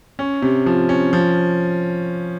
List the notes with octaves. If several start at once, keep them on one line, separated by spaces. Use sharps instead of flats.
C#4
C3
F3
C#4
F3